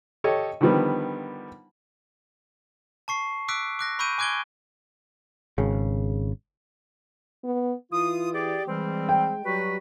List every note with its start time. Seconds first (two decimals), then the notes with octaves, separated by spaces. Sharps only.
0.24 G4 A4 C#5 D#5
0.61 D3 D#3 F3 G3 B3
3.08 A5 C#6 C7
3.48 D6 E6 F#6 B6 D7
3.79 D6 F#6 A#6
3.99 B5 C#6 E6 G6 D7 D#7
4.18 G#5 D6 F#6 G#6 D7 G7
5.58 G#1 C#3
7.44 B3
7.92 E3 F4 D#6
8.33 G4 G#4 D5
8.68 E3 G3 G#3 C4
9.09 G5
9.45 F#3 G3 F#4 B4